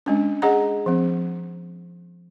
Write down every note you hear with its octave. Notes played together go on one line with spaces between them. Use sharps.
G#3 C#4 D4
G#4 D#5 F#5 A#5
F3 C4